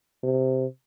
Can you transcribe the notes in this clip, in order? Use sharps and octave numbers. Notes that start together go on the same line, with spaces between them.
C3